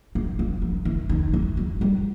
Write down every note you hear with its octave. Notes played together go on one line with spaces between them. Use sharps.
F3
F3
F3
E3
D#3
E3
F#3
G3